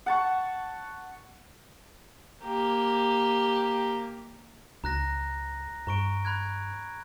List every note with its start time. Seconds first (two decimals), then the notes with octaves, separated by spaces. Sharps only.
0.06 F#5 A5 C#6
2.44 A#3 G4
4.84 C#2 A#5 F#6 A#6
5.87 G2 A#5 C#6 D7
6.25 B5 F#6 G#6